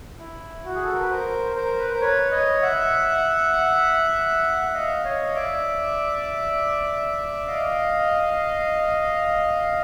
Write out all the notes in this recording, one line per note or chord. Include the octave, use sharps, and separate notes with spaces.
E4
F#4
G#4
A4
A#4
B4
A#4 C5
A#4 C5
B4
C5
B4 C#5
C#5 D#5
E5 F#5
F#5
D#5 F5
C#5 D#5
F5
D5 E5
D#5 F5